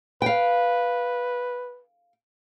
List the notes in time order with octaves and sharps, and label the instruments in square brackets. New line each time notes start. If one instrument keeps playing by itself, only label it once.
[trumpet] B4 [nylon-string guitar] F5 G5